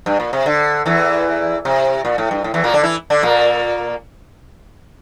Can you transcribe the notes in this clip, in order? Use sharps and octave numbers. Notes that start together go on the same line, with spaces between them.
G2
A#2
C3
D3
E2 E3
C3
A#2
A2
G2
A2
E2 E3
A#2 A#3
D3 D4
E3 E4
D3 D4
A#2 A#3